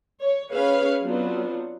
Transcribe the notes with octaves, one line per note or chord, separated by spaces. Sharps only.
C#5
C#4 G#4 B4 C#5 F5
F#3 B3 C4 D4 F4